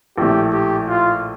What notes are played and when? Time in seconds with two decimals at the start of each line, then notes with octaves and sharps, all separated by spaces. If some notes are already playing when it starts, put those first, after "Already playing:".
0.18 A#1 A2 A3 G4
0.53 G4
0.88 F4